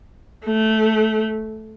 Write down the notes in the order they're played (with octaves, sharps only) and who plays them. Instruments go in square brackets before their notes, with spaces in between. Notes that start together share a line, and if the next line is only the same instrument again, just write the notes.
[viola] A3